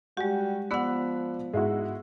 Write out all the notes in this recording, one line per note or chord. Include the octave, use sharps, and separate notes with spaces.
G3 G#3 F#4 G4
F3 B3 D5 F#5 B5 E6 F#6
G#2 G#3 E4 F#4